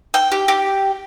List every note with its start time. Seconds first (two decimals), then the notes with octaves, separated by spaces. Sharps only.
0.14 G5
0.32 G4
0.48 G4